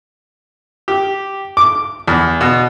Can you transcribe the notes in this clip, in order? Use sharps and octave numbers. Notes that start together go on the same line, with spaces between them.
G4
D6
E2
B2